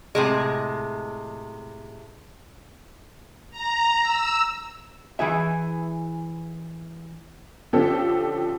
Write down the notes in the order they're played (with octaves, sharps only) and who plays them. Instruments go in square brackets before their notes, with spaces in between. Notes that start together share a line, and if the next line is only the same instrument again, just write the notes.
[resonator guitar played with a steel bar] A2 C3 G#3
[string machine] A#5
E6
[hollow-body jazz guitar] E3 E4 G#4 E5
[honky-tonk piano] D3 F3 C#4 G4 A4